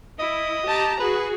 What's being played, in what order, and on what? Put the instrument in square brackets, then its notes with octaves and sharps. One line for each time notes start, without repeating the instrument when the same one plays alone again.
[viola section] E4 [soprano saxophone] D#5
[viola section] G4 A5 A#5
[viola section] F#4 G#4 [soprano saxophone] B4